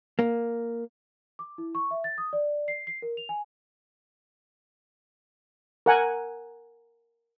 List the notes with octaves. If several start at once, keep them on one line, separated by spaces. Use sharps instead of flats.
A#3
D6
E4
C#6
E5
A6
D#6
D5
C7
C7
A#4
F7
G#5
A#4 F#5 G#5